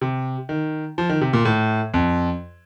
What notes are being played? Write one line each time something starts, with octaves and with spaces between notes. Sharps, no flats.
C3
D#3
F3
D#3
C3
A#2
A2
F2